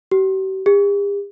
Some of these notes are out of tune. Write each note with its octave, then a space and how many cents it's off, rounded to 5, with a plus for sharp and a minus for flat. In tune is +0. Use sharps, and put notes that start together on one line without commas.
G4 -45
G4 +45